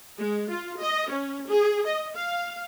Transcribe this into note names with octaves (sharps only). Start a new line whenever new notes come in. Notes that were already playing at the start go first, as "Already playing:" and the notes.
G#3
F4
D#5
C#4
G#4
D#5
F5